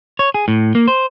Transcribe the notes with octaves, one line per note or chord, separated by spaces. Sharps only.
C#5
G#4
A2
A#3
C5